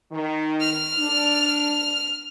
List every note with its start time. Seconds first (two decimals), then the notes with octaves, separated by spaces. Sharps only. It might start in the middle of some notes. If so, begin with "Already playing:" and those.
0.12 D#3
0.61 F6
0.98 D4